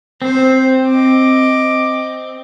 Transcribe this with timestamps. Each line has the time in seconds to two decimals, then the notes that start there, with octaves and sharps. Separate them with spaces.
0.22 C4 C5
0.88 D#5 D6